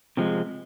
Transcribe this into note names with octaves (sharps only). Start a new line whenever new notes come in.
C3 F3 G#3